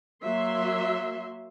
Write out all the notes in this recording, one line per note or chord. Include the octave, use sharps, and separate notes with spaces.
F#3 A#3 E5 C6